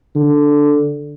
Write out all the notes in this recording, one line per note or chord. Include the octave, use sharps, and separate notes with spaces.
D3